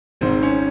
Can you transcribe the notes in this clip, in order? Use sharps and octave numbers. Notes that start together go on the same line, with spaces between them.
G#1 G#2 D#3 C4
C#4